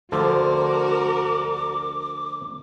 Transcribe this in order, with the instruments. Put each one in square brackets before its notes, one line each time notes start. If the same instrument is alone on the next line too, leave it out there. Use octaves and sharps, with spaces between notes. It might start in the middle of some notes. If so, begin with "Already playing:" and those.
[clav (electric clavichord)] D2 D3 F3 [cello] F#4 A#4 [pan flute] D6